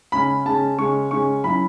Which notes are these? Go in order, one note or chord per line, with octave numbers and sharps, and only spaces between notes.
C#3 G#3 C#4 B5
C#3 G#3 C#4 A5
C#3 G#3 C#4 C#6
C#3 G#3 C#4 C#6
F#3 C#4 E4 B5